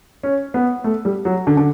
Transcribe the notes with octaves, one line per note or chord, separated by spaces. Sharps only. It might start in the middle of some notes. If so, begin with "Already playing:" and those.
C#4
B3
A3
G3
F#3
D3
D3